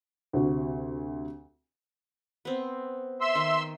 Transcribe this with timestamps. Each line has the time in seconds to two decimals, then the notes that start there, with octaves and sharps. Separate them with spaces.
0.33 D2 C3 F#4
2.45 B3 C4
3.21 E5 C6 E6
3.35 D#3